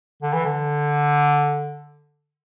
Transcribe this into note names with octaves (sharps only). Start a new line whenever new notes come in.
D3
E3
D3